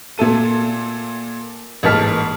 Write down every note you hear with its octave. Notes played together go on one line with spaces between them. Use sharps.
A#2 A3 A4 D#7
A1 G#2 A#3 A5 F6 B6